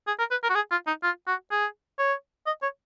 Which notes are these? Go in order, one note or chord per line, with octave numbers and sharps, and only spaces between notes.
G#4
A#4
B4
A#4
F#4
G#4
F4
D#4
F4
F#4
G#4
C#5
D#5
C#5